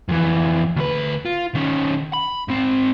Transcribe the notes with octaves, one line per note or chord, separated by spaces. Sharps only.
F2 E3
D2 B4
F4
D#3 C#4
B5
G#2 C4